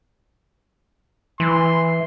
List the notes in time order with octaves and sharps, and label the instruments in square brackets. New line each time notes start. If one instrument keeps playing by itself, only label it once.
[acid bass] E3 [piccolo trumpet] C6